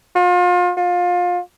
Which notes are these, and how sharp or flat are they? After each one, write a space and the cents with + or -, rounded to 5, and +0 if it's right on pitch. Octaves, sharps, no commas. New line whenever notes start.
F4 +35
F4 +25